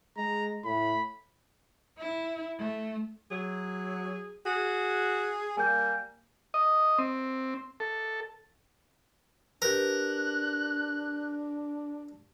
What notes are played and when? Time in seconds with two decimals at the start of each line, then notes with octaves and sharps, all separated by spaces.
0.17 G#3 A#5
0.65 A2 B5
1.98 E4
2.58 A3
3.31 F#3 G#4
4.46 F#4 G#4
5.57 G3 A#3 G#5 G6
6.54 D#5
6.99 C4
7.80 A4
9.62 D4 G4 A#4 B4 F#6